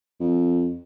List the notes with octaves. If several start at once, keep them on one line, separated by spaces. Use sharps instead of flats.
F2